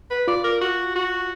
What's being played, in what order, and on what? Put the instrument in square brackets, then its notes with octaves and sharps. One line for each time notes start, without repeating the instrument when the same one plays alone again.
[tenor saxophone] B4
[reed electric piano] F4 [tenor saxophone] D5
[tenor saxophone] A#4
F#4
F#4